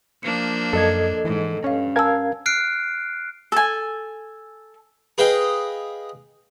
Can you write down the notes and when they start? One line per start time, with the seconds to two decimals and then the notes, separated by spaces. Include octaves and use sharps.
0.23 F3 A#3 D4 C#7
0.73 F#2 A4 D#5 G#6
1.25 G#2 E3
1.64 G2 C#4 C#5 F5
1.96 A#4 F5 G#5 A5 E6 G#6
2.46 F6 F#6 C7 D7
3.52 A4 G#5
5.18 G#4 B4 D#5 F5 G5